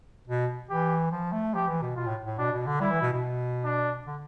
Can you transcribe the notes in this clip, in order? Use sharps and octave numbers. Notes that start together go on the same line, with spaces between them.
B2
E3 G4
F3
A3
F3 G4
E3
B2
B2 F4
A2
A2
B2 D4
B2
D3
G3 E4
E3
B2
B2
D4
D3